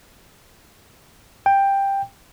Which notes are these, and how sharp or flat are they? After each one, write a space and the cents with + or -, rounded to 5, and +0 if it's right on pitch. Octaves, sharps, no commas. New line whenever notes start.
G5 +10